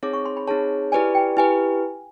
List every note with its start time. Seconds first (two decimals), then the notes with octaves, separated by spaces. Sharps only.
0.03 C4 D#4 G#4 C#5 D6
0.13 C#6
0.25 C6
0.37 B5
0.48 C4 D#4 G#4 C#5 A5
0.92 E4 G4 B4 D5 G#5
1.15 G5
1.37 E4 G4 B4 G#5